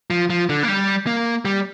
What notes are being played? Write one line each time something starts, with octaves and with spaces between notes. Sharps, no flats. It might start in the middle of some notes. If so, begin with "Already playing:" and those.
F3
F3
D3
A#3
G3
A#3
G3